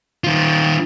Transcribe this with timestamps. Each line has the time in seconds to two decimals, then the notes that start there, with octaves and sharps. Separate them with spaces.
0.24 D#3 F4